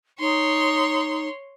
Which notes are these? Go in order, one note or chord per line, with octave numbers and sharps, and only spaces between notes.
D#4 C#5 C6